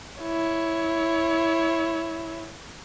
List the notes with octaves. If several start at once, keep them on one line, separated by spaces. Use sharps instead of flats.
E4 C#5